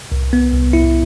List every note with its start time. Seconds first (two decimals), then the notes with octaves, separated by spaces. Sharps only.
0.12 C2
0.33 B3
0.52 C2
0.73 E4